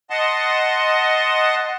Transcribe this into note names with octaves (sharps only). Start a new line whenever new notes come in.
D#5 F#5 A5 C6